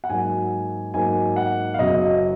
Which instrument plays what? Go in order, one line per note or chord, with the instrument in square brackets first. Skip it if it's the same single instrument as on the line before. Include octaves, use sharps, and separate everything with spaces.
[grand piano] F#5
G#2 F#3 A#3 G#5
G#2 F#3 A#3 G#5
F#5
F5
F#1 F#2 C#3 F#3 D#5